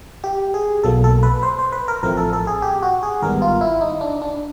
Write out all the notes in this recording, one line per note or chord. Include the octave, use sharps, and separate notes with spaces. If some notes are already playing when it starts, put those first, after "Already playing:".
G4
G#4
B1 B2 F#3 A#3 A4
A4
B4
C5
C5
B4
A#4
A1 A2 F3 A3 C4 A#4
A4
A4
G#4
G4
F#4
G#4
G#1 G#2 D#3 G3 B3 A#4
F4
E4
D#4
D4
D4